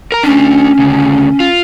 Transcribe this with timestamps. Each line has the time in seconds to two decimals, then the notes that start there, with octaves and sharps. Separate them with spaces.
0.12 A#4 A#5
0.24 A3 C#4 D4
0.79 D2 C#3
1.40 F4